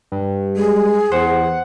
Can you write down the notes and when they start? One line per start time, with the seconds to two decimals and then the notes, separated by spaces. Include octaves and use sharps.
0.12 G2
0.57 G#3 G#4
1.12 E2 C5 F#5